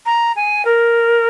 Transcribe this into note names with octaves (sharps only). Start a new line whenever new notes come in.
A#5
G#5
A#4